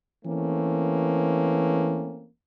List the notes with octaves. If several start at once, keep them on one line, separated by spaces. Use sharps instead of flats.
E3 A3 A#3 C4 C#4